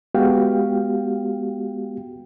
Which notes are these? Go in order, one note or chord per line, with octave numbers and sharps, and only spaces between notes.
G#3 B3 F#4 G4 F5 G5